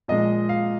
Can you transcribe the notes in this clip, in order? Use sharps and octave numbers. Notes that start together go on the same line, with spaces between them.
A#2 F3 G#3 D#5
F5